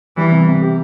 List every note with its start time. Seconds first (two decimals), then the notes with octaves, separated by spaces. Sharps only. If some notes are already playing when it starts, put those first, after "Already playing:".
0.17 E3 G3
0.32 C3
0.48 C3
0.62 G4